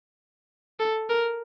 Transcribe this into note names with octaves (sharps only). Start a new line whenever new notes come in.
A4
A#4